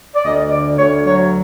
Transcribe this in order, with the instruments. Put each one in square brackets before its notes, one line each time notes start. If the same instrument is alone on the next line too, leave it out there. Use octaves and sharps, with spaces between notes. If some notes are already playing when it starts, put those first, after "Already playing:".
[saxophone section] D5
D2 D#5
D3 D5
D2 C#5
F#3 C#5